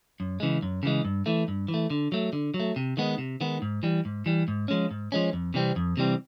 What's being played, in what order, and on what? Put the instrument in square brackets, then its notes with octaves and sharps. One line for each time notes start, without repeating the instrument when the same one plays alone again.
[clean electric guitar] F#2
C#3 E3 G#3
F#2
C#3 E3 G#3
G2
E3 A3
G2
E3
A3
D3
F#3 A3
D3
F#3
A3
C3
D#3 G#3 B3
C3
D#3 G#3 B3
G#2
E3 G3
G#2
E3 G3
G#2
F3 G#3 C#4
G#2
F3 G#3 C#4
F2
C3 E3 G3 C4
F2
C3 E3 G3 C4